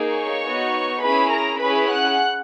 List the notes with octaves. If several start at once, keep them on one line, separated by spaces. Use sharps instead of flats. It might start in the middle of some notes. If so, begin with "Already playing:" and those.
Already playing: A#3 D#4 G#4
C#5 C#6
B3 D#4 F#4
C#4 E4 G#4 B4 B5
A#4 A#5
C#4 E4 G#4 B4 B5
F#5 F#6